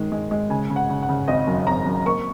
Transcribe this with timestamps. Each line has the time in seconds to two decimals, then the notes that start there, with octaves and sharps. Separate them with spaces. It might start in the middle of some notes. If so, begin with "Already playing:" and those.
Already playing: D#3 G#3
0.12 G#3
0.31 G#3
0.50 C#3 G#5
0.70 C#3
0.76 F#5
0.90 C#3
1.02 F#5
1.09 C#3
1.28 G#1 D#5
1.47 F#2
1.67 G#1 A#5
1.86 F#2
2.06 A#3 C#6